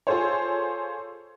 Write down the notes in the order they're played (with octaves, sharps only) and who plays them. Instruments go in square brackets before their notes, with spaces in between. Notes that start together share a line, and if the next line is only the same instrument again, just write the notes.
[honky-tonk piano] F4 G#4 A4 C5 C#5